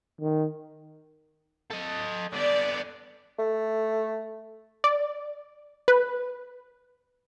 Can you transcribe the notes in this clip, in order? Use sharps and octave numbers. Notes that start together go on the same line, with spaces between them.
D#3
A4 D#5
D3 B3 D5
A3
D5
B4